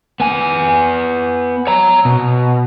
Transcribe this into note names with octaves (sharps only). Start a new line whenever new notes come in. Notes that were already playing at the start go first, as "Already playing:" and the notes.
B3 G#5
C#5 A#5
B2